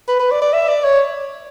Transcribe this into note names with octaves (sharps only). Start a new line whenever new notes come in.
B4
B4
D5
D5
E5
D5
C#5